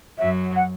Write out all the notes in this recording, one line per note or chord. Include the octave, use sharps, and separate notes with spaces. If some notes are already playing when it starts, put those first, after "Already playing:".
F#2 F#3 E5
F#5